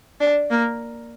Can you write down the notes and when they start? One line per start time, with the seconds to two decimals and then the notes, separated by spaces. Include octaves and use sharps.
0.20 D4
0.50 A#3